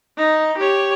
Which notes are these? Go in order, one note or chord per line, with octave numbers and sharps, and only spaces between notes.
D#4
G4 C#5